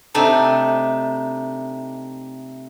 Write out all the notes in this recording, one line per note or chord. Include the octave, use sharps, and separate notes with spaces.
C3 A3 D4 D#4